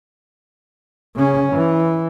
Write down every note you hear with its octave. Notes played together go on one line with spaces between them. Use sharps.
C#3 C#4
E3